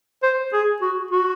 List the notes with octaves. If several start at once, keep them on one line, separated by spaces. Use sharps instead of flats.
C5
G#4
F#4
F#4